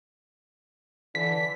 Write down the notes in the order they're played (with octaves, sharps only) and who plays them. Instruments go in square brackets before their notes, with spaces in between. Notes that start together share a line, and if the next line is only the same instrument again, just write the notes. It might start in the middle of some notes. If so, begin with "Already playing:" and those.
[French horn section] D3 E3 [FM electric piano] B6